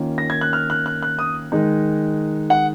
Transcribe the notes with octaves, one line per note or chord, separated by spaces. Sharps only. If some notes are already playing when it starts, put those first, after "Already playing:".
Already playing: D#3 A#3 C#4 F4
A#6
G#6
F#6
F6
F#6
F#6
F#6
D#6
D#3 G#3 D#4
F#5